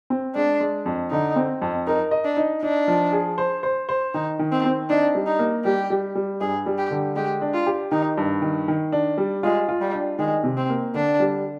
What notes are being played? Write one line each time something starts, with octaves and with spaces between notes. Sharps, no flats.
C4
G#3 D4
G#3
F2
D3 D#4
C4
F2
D#4 A#4
D#5
D4
D#4
D4 D#4
F3
G#4
C5
C5
C5
D#3 D#4
D#3
C4
C4
D4 D#4
G3
D#4
A#3
G3 G4
G3
G3
G2 G#4
G3
G4
D3
G#3 G4
D4
F4
G4
D#3 D#4
G2
D#3
D#3
D4
G3
G#3 F4
F4
G3
D4
D#3 G#3
C3
C4
A#3
D3 D4
G3